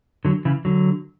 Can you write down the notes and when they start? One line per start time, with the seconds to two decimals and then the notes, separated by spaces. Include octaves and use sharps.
0.25 D3 F#3
0.45 C#3 E3
0.65 D3 F#3